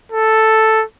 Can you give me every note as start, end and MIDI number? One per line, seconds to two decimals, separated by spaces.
0.12 0.84 69